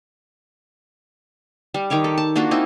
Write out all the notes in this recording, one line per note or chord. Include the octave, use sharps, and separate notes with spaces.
G3
D#3 G4 C#5 D6
A4
A5
A#3 D4 F4 F#4
C4 D#4 E4